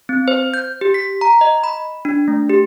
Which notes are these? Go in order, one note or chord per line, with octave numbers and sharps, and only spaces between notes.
C4
C5
G6
G4
B6
A#5
D#5
B5
D4
A3
G4